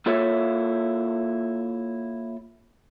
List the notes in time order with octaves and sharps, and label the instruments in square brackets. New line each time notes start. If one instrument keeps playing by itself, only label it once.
[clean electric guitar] A#3 E4 F4 A4 C#5 E5